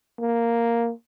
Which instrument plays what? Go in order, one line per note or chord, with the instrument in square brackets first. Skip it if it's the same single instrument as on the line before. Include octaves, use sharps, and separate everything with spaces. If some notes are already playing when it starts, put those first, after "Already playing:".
[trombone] A#3